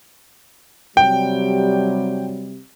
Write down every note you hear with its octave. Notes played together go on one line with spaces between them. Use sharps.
C3 F#3 G3 G5